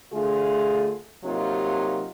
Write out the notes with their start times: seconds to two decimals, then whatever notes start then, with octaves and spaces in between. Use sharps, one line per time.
0.12 D2 D3 A3 F4 G#4
1.24 C3 F#3 A#3 D#4 F4 G4